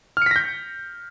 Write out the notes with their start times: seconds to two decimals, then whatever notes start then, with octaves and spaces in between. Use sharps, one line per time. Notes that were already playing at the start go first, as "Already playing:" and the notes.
0.17 F6
0.22 C#7
0.26 B6
0.31 A#6
0.36 G6